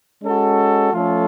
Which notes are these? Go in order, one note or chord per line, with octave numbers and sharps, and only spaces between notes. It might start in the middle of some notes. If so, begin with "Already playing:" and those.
G#3 C#4 F#4 A4
F3 A3 C#4 F4 A4